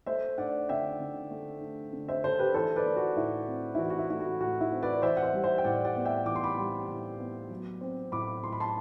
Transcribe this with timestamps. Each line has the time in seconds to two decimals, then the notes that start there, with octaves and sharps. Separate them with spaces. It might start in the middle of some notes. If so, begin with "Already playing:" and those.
0.06 A3 C5 E5
0.37 D4 D5 F#5
0.69 D3 E5 G5
1.00 D3
1.31 A3
1.61 D4
1.93 D3
2.08 C5 E5
2.24 D3 A4 C5
2.39 G4 B4
2.54 E3 A4 C5
2.76 B4 D5
2.86 A3
2.96 F#4
3.16 A2 E4
3.47 C4
3.75 E4
3.78 E3 F#4
3.90 F#4
3.99 E4
4.10 A3 E4
4.20 F#4
4.41 A2 F#4
4.61 E4
4.72 C4
4.83 B4 D5
5.02 E3 C5 E5
5.17 F#5
5.23 C5 E5
5.33 G3
5.44 C5 E5
5.58 G5
5.64 A2 D5 F#5
5.85 D5 F#5
5.96 B3
6.05 E5 G5
6.26 E3 D6
6.36 C6
6.44 B5 D6
6.57 G3
6.88 A2
7.20 B3
7.50 F#3
7.81 C4
8.12 A2 B5 D6
8.43 A2 C6
8.52 B5
8.60 A5 C6